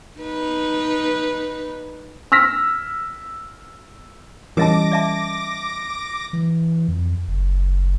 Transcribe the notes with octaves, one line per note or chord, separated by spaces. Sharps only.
D#4 B4
E6 F6 A#6 B6
E3 G3 C#4 A#4 D#5 A5 D6 A#6
D5 E5 A5
E3
F2
F#1